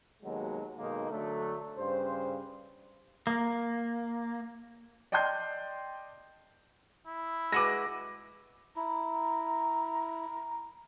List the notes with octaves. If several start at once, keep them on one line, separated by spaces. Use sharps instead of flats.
D#2 B2 F#3 G#3
B1 D#3 G#3 A#3 D#4
D3 F#3 A3
G2 C#3 C5
A#3
D5 D#5 G5 A5 C6 G6
E4
G#3 F#4 B4 D6 A#6
E4 A#5